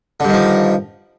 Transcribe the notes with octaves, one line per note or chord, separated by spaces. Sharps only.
G2 D3 D#3 F3